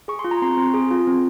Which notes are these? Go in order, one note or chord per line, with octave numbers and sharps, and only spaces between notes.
G#4 C#6
C6
F4
A#5
C4 C6
C4
G#4
F4
C4